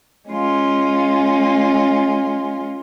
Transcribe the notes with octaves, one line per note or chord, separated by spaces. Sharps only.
G#3 C#4 F4